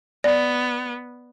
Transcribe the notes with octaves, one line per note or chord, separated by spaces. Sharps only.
B3 D5